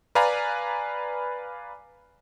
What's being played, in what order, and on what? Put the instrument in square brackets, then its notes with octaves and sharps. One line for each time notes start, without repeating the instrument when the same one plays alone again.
[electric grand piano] B4 D5 F5 G#5 A#5 B5